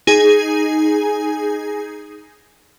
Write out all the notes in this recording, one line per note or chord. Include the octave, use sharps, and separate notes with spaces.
D#4 G#4 G#5